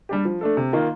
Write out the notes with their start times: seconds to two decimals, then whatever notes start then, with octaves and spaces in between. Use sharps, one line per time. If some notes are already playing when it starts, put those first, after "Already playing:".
0.09 G3 D4 G4
0.25 F3
0.41 A3 D4 A4
0.57 C3
0.73 D#3 A#3 F4